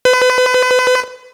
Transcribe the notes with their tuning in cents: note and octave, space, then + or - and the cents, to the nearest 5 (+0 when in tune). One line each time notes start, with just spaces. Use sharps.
B4 +35